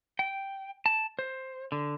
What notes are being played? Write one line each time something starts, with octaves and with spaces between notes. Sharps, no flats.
G5
A5
C5
D3